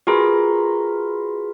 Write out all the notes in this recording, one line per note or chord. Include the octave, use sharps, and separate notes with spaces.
F4 F#4 G#4 A#4 B4 B5